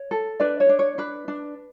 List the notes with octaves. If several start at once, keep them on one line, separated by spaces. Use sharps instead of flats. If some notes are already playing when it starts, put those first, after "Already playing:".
Already playing: C#5
A4
D4 B4 D5
C#5
D4
C#5
D4 B4
D4